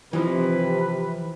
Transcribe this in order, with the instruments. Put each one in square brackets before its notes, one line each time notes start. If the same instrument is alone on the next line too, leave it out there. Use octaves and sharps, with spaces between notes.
[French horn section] C3 [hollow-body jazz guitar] E3 F3 D#4 [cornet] B4